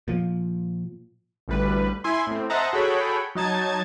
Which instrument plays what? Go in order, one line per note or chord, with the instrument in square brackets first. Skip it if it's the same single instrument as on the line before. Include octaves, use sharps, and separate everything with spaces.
[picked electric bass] A#2 F3
[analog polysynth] A1 D2 G3 B4
E4 G#5 C6
A2 C4
C5 D#5 E5 F#5 A5 A#5
F#4 G#4 A4 C#5 G5 B5
F#3 D#4 A5 G#6